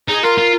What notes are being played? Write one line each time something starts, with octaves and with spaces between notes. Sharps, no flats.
D#4 G#4
F4 A#4
F4